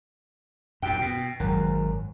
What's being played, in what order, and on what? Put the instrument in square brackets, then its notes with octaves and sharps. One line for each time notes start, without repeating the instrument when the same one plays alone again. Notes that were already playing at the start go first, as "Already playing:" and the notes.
[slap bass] F#2 A#2 [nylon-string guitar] G5
[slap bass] B2
[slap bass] G#1 [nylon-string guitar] F#2